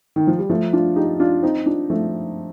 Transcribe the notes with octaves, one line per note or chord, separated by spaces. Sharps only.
D#3
F3
G3
F3 A3
D4 F4
D#4 G4
D4 F4
C4 D#4
D4 F4
F3 A3